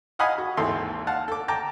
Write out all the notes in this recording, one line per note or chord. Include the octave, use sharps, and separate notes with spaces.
D#5 F5 F#5 G#5 B5 D#6
F#4
G#1 D#2 E3 A4 C6
F5 F#5 A5
A4 D6
G5 A5 A#5 D6